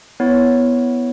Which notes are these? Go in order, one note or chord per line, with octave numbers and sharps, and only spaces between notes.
B3 E4 C#5